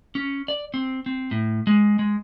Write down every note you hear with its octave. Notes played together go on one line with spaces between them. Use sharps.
C#4
D5
C4
C4
A2
G#3
G#3